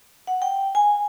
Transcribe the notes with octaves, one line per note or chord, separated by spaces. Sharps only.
F#5
G5
G#5